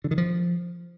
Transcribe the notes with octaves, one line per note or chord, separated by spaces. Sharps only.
D3
D#3
F3